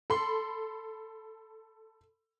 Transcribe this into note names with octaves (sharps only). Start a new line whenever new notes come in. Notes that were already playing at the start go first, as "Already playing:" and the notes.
A4 B5 C6